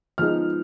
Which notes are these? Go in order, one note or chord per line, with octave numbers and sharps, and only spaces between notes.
F3 G#3 B3 D#4 F6